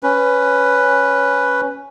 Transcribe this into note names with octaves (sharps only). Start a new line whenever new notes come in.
C#4 B4